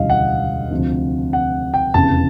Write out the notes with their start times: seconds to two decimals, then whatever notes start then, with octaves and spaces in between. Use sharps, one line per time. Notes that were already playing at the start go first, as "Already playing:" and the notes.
Already playing: E1 D2 C#3 E3 G3 D#5 F5
0.10 F#5
0.71 D2 C3 F3
1.33 F#5
1.74 G5
1.94 F1 E2 C#3 A5